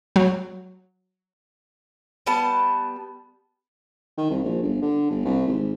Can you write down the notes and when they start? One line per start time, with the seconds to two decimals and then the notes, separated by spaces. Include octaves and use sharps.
0.16 F#3
2.27 G3 B3 A5
4.18 D#3
4.30 C2
4.44 A#1
4.62 G1
4.82 D3
5.10 G1
5.25 C2
5.47 G#1